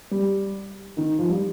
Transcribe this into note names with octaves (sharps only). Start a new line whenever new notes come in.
G3
D#3
F3
G3